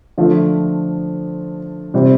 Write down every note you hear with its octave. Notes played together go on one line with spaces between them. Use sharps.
D3 F3 A3
C3 G3 C4 G4